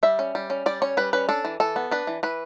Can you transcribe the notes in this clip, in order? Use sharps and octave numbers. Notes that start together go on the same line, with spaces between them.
G3 E5
C#4
G3
C#4
G3 D5
C#4 C#5
G3 B4
C#4 B4
D4 A4
E3
E3 A4
B3
D4 B4
E3
E3 B4